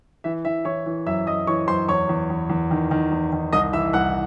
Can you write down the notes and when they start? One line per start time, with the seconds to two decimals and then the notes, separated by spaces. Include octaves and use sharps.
0.24 E3 E5
0.45 E3 E5
0.65 E3 C#5 C#6
0.86 E3
1.07 F#2 E5 E6
1.27 F#2 D#5 D#6
1.47 E3 C#5 C#6
1.68 F#2 C5 C6
1.88 E2 C#5 C#6
2.09 E2
2.30 E2
2.50 E2
2.71 D#3
2.91 D#3
3.12 E2
3.33 D#3
3.53 C2 D#5 D#6
3.73 E3 E5 E6
3.93 C2 F#5 F#6